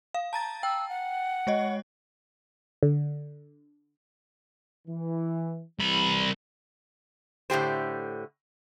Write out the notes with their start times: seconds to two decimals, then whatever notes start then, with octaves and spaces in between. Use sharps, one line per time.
0.14 F5
0.33 A5 A#5 A6
0.63 G5 E6
0.89 F#5
1.47 G#3 C#5 D#5
2.83 D3
4.88 E3
5.80 C2 E3 G3 B5
7.50 A2 D3 G4 C5